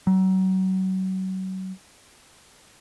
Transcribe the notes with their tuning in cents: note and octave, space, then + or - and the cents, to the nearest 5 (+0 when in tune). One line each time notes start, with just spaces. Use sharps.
F#3 +30